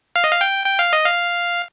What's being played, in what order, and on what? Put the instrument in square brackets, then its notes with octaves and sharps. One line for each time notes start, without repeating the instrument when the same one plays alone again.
[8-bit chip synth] F5
D#5
F5
G5
G5
F5
D#5
F5